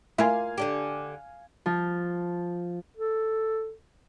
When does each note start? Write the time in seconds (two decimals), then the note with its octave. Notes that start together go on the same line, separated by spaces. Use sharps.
0.18 A3 A#3 E4 F4 E5 F5 G#5
0.58 D3 D4 G4
1.66 F3
2.97 A4